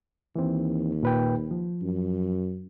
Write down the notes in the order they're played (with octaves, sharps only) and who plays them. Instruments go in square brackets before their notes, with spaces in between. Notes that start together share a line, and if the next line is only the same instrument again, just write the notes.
[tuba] D#2 [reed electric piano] E3 C4
[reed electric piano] A#2 B4 G5
F3
[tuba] F#2